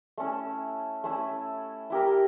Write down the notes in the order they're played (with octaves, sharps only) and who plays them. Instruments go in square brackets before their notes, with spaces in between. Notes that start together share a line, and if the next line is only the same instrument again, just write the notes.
[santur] A3 C#4 E4
A3 C#4 E4
E4 G4 A#4